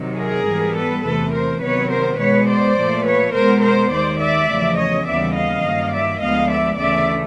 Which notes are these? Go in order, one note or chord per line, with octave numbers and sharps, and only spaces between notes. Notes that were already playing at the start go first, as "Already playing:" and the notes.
Already playing: C3 D#3 F#3
G#4 A#4
G#2 E3 G3 B3
A4 B4
E2 C3 E3 A3 A4 B4
A#4 C5
C3 D#3 F#3 B3 B4 C#5
A#4 C5
B2 G#3 B3 B4 C#5
C5 D5
A#2 F3 A3
B4 C#5
B2 G#3 B3 A#4 C5
A#4 C5
D#2 D#3 G#3 C5 D5
D5 E5
E2 C#3 F3 A3
C#5 D#5
D#2 C#3 E3 G3 B3 D5 E5
D#5 F5
G2 D#3 F#3 A#3
D5 E5
D2 D3 F3 G#3 B3 D#5 F5
D5 E5
D2 C#3 E3 A3 D5 E5